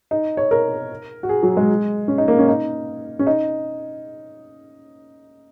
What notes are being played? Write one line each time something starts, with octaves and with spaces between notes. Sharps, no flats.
D#4
C#5
A#4
F#4
G#4
F#3
G#3
C#4
D#4
A#3
C#4
D#4
C#4
D#4